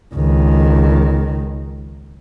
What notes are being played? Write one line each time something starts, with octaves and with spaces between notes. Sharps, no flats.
C#2 D#3